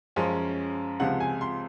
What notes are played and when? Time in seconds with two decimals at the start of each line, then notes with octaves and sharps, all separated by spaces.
0.16 F#2 F3 G#3 C#4
1.00 C#2 C3 F3 G#3 F#5
1.20 G#5
1.41 C6